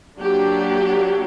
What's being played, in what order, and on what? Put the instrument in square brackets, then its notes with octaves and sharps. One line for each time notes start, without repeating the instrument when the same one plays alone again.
[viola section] F#3 A#3 D4 G4